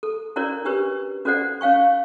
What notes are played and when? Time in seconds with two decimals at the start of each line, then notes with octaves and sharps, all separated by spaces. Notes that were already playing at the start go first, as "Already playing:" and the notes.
0.03 A4
0.36 C#4 E4 F#4 A#4 C#5 D5
0.65 D4 F#4 G4 B4 C#5
1.25 C#4 F#4 A4 C5 D5 F#5
1.61 C#4 C#5 F5 G5 C#6